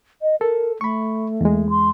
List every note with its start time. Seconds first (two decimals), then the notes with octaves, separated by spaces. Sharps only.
0.22 D#5
0.41 A4 A#4
0.81 A3 B5 C#6
1.41 E2 G#3
1.70 C6